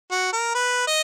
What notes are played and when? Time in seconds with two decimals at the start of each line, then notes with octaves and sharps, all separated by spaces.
0.11 F#4
0.32 A#4
0.54 B4
0.87 D#5